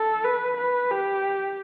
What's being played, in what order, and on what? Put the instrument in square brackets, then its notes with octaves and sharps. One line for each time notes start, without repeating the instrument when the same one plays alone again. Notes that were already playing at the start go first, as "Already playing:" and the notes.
Already playing: [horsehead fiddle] A4
B4
B4
G4